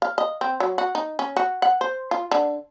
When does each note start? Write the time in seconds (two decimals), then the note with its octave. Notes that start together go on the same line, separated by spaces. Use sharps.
0.02 F5
0.18 D#5
0.41 C4
0.60 F#3
0.78 F#4
0.95 D#4
1.19 C#4
1.36 F#4
1.62 F#5
1.81 C5
2.11 F4
2.31 D3